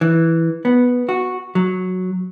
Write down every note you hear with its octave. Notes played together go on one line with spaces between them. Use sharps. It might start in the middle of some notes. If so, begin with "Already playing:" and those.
E3
B3
F#4
F#3